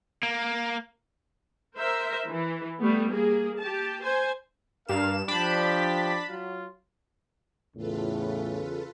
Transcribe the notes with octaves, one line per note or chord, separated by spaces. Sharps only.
A#3
A#4 C5 E5
E3
G3 A3 B3
A#3 G#4
G4 A5
C5 G#5
G2 D4 A#4 F5 E7
F3 D4 G4 A5 B5
F#3 F4
E2 A2 C#3 F4 A4 B4